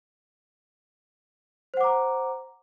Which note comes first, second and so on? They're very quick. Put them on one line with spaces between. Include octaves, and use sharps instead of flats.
C5 F#5 D6 A#5